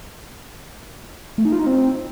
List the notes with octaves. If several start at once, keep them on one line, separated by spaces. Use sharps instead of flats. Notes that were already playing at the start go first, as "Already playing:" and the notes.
A3
D#4
F4
D#4
C4